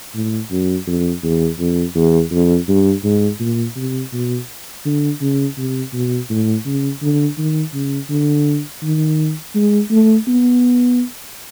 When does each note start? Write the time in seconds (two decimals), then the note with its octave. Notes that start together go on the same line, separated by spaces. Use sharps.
0.14 A2
0.51 F#2
0.87 F2
1.23 E2
1.59 F2
1.96 E2
2.32 F2
2.68 G2
3.04 G#2
3.40 A#2
3.76 C3
4.13 B2
4.85 D3
5.21 C#3
5.58 C3
5.93 B2
6.30 A2
6.66 C#3
7.02 D3
7.38 D#3
7.74 C#3
8.10 D3
8.83 D#3
9.55 G#3
9.91 A3
10.28 B3